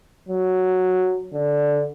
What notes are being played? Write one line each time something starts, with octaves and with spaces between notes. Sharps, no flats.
F#3
D3